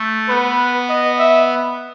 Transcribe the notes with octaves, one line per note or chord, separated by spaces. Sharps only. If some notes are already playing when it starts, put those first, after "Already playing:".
Already playing: A3
B3 B4
D#5
E5